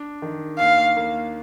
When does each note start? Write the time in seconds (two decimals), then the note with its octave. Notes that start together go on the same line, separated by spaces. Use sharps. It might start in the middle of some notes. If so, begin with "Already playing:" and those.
Already playing: D4
0.22 D#3
0.59 D#2 F5
0.97 A#3